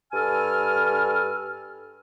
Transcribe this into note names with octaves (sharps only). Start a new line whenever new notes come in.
G2 A4 G#5 F6